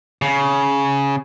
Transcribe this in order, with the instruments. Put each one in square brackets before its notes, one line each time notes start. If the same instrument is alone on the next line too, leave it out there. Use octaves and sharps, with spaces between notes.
[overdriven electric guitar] C#3